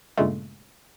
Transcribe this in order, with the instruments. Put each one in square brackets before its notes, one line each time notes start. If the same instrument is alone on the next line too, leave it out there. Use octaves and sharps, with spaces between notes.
[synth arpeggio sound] G2 A#2 C#3 G#3 A3